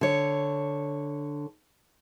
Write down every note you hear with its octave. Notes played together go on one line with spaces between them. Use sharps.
D3 C#5